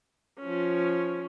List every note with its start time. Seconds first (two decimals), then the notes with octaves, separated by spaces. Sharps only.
0.41 F3 C#4